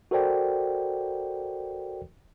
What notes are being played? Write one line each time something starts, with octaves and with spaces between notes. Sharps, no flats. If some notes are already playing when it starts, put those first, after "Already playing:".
F#4 A4 A#4 C5 D5 G5